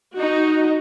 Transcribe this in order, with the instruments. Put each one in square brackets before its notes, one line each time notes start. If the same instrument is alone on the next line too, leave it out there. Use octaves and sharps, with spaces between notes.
[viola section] D#4 F#4